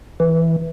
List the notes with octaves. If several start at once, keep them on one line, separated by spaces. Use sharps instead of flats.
E3